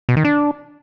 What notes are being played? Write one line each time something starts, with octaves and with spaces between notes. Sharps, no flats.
B2
D#3
D4